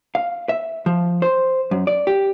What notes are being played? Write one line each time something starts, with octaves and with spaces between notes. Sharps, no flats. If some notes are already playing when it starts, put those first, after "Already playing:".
F5
E5
F3
C5
F#2
D5
G4